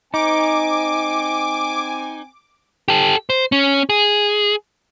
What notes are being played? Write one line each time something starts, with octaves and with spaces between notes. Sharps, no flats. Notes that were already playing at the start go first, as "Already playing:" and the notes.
C4 D#4 G#5 D6
G4 A4
C5
C#4
G#4